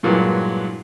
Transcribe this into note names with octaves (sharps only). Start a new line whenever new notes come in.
G2 A#2 E3 F#3 G#3